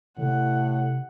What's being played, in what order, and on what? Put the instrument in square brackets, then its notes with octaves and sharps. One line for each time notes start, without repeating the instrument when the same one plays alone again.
[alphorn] A2 [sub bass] C3 [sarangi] F#5